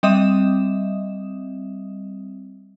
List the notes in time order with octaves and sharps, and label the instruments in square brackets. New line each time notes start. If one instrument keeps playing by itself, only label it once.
[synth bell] G3 C4 D#5 E5 D#6 E7